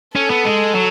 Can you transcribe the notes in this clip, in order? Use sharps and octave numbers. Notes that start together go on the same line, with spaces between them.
C#4 A4
B3
G#3
F#3